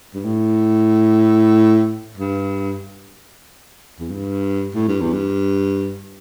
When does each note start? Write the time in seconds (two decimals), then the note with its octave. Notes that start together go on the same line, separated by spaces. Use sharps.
0.14 G2
0.24 A2
2.17 G2
4.00 E2
4.10 G2
4.74 A2
4.88 G2
5.01 E2
5.13 G2